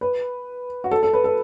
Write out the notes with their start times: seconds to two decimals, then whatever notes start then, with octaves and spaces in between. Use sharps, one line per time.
0.01 B4
0.84 F#4
0.91 A4
1.03 A4
1.13 B4
1.24 A4